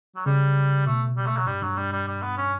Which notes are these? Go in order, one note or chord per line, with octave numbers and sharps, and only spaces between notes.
F#3
C#3 G3
B2 A3
G3
A3
F#3
G2 G3
G2 F#3
G2 G3
G3
G3
B3
C#4